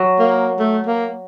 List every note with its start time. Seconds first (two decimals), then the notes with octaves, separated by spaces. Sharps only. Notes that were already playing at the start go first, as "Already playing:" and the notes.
Already playing: F#3
0.19 A#3
0.59 A3
0.87 A#3